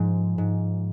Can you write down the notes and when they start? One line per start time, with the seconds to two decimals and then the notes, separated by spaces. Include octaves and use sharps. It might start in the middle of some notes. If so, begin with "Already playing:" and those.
Already playing: G#2 F3 G#3
0.38 G#2